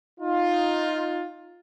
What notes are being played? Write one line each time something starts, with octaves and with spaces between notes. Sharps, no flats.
D#4 F4